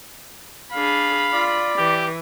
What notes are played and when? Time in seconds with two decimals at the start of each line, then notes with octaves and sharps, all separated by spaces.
0.74 D4 G#4 F5 B5
1.33 F4 D5
1.78 E3 G4